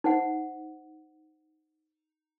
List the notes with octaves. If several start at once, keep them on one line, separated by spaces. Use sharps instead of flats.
D#4 C5 F#5